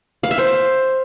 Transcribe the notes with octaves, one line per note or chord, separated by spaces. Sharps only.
F5
E5
C5